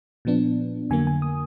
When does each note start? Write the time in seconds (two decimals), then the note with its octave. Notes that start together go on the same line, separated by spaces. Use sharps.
0.25 A#2 F3 B3 D4
0.90 F2 D3 F#3 A#3 G#5
1.07 G#5
1.22 D#6